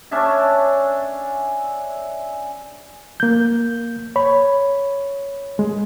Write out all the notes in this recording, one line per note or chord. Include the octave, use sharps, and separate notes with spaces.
C#4 D4 E5 A5
A#3 G6
C#5 B5
G#3